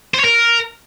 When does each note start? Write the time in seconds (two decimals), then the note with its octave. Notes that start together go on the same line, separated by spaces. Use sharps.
0.14 C5
0.19 C#5
0.24 A#4